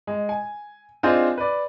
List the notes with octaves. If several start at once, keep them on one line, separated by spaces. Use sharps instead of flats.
G#3
G#5
C4 D4 D#4 F4 G#4 C5
B4 D5